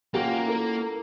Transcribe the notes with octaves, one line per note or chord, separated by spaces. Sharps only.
A#3 C#4 F4 F#4 G5
E4 A4 A#4